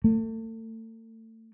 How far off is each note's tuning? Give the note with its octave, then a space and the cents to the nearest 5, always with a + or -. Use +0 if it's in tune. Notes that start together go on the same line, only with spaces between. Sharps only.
A3 +35